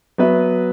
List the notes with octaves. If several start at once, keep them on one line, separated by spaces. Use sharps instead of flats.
F#3 B3 F#4 B4 E5